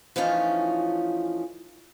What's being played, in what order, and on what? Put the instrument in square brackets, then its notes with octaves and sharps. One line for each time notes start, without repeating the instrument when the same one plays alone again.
[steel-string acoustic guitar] E3 F3 A3 C#4 D#4 F4